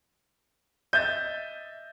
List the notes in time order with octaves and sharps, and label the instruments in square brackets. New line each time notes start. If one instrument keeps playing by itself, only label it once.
[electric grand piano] D#5 E5 A6 [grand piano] G6